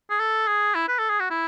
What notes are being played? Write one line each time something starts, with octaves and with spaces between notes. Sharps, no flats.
G#4
A4
G#4
E4
B4
A4
G#4
F#4
E4